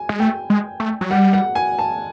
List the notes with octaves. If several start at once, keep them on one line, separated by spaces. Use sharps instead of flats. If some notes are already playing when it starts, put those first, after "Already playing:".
Already playing: G#5
G#3
A3 G5
G#3
A3
F#3
G3 F#5
F#5
G#5
A5